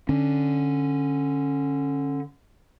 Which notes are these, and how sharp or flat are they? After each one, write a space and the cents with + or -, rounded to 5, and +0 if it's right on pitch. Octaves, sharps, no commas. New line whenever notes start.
D3 +0 C#4 -10